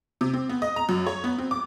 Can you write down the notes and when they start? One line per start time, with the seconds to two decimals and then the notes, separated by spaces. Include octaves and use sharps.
0.21 C3
0.33 C4
0.49 B3
0.62 D#5
0.76 A#5
0.89 F#2
1.07 C#5
1.24 B3
1.38 C4
1.51 D6